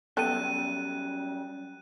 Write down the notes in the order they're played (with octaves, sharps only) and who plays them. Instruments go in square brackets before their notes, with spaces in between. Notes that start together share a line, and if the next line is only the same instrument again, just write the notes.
[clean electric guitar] F#2 G3 E5 [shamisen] B3 A4 G5 [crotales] F#6 D#7